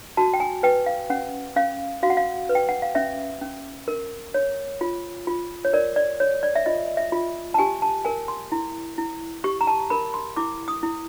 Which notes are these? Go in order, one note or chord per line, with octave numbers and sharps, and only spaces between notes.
F#4 A5
G5
G#5
B4 G5
F5
C#4 F#5
C#4 F5
F#4 F5
F#5
F5
B4
G5
F#5
F5
C#4 E5
C#4
A#4
C#5
F4
F4
C#5
A#4 D5
D5
C#5
D5
E5
F4 D#5
E5
F4
A5
G4 G#5
A5
A#4 G#5
C6
E4
E4
G4 C#6
A#5
A5
A#4 B5
C6
E4 D6
D#6
E4